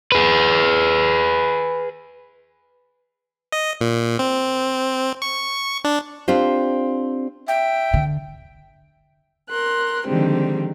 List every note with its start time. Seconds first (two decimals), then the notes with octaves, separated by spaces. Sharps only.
0.12 G#4 B4
3.52 D#5
3.81 A#2
4.19 C4
5.22 C#6
5.84 D4
6.28 C4 D4 F4 G4 C5
7.48 E5 G5
7.94 D3
9.49 A#4 C6 F#6
10.07 D3 D#3 F3 G3 G#3 C4